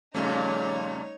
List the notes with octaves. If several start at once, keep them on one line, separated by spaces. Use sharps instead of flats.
F2 A#2 C#3 G3 A3 C#4 D#4 C#5